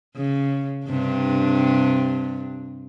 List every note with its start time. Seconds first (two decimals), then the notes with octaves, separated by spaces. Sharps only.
0.16 C#3
0.86 G2 C3 D4